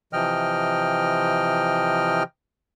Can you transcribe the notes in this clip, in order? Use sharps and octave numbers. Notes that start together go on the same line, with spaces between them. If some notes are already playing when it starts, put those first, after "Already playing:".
C3 E3 F3 D#5 G5 F6